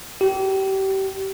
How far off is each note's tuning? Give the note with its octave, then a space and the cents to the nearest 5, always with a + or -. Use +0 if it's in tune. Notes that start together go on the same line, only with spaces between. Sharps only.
G4 -30